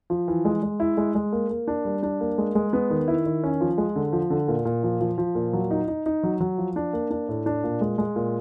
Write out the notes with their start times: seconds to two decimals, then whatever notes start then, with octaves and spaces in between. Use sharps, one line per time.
0.10 F3
0.28 E3
0.45 G#3
0.63 G#3
0.80 E4
0.97 G#3
1.15 G#3
1.32 A#3
1.50 A#3
1.68 D4
1.85 G3
2.03 D4
2.21 A#3
2.38 G#3
2.55 G#3
2.73 B3
2.90 D#3
3.08 E4
3.26 D#3
3.43 C#4
3.61 F3
3.78 G#3
3.96 D3
4.13 F3
4.30 D3
4.48 A#2
4.65 A#2
4.83 F3
5.01 F3
5.18 F3
5.35 A#2
5.53 F#3
5.71 D#4
5.88 D#4
6.06 D#4
6.23 F#3
6.40 F#3
6.58 F3
6.76 D4
6.93 A#3
7.11 D4
7.29 A2
7.46 D4
7.64 A#2
7.81 G#3
7.98 G#3
8.16 A#2